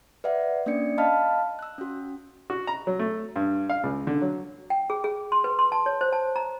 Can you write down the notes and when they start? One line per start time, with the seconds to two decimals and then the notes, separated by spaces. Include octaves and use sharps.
0.24 B4 D5 E5 F#5
0.66 A#3 C#4 D4 D5 C#7
0.98 D#5 F5 A5 B5 F6
1.59 E6 F#6
1.78 C#4 F#4
2.50 F#4
2.67 A#5
2.87 F#3
2.99 A3
3.36 G2
3.70 F5
3.83 C#2
4.07 D3
4.22 F#3
4.70 G5
4.90 G#4
5.04 G#4
5.32 C6
5.44 B4
5.59 C6
5.72 A5
5.86 C#5
6.01 C5
6.13 A5
6.36 A#5